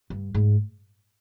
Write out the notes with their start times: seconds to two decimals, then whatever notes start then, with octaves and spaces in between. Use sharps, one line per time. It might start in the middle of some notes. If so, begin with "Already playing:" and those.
0.10 G2
0.34 G#2